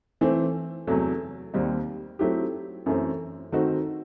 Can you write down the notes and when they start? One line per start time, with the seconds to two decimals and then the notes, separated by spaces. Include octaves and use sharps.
0.21 E3 A3 C4
0.88 E2 C3 F#3 A3
1.54 D#2 D#3 G3 C4 D#4
2.19 F#3 A3 C4 E4 G4
2.86 F#2 E3 A3 C4
3.52 D#3 A3 C4 D#4 F#4